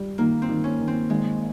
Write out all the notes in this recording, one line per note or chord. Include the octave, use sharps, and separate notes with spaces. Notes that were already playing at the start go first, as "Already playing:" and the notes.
Already playing: G3
D#3 A#3
C4
D#3
C#4
D#3
C4
G#1 G#3